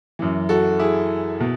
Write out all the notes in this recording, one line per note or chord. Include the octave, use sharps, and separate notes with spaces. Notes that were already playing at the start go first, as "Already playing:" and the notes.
F#2 E3
F#4 A4
E4 G#4
B2